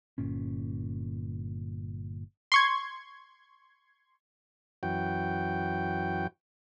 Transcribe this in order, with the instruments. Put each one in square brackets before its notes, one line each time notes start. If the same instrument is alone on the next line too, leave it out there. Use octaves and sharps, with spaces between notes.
[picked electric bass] G1 A#2 C#4
[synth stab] C6 C#6 G#6
[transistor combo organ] F#2 E3 F#4 G5